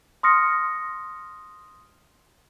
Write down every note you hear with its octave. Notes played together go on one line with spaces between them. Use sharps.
C6 D#6 F6 A#6 C#7